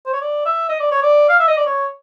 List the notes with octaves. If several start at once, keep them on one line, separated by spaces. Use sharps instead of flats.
C5
C#5
D5
E5
D#5
D5
C#5
D5
F5
E5
D#5
D5
C#5